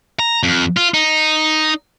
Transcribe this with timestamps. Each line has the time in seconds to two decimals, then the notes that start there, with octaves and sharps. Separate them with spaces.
0.19 A#5
0.43 F2
0.77 F4
0.94 D#4